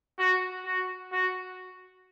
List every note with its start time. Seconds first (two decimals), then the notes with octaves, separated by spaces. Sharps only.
0.19 F#4
0.66 F#4
1.12 F#4